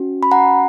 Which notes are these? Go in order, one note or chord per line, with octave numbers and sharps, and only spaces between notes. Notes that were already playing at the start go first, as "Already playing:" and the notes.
Already playing: C#4 F#4
B5
F#5 A#5